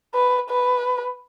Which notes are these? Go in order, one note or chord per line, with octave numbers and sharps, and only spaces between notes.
B4
B4